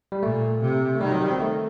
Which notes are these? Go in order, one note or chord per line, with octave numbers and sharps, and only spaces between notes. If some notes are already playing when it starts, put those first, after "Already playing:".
G3
A#2 A3
C3
A3
D#3 G3
F#3
G3
C4
A3